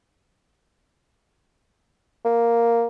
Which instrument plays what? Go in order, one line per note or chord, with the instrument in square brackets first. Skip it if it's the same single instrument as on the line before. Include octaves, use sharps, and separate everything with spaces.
[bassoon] A#3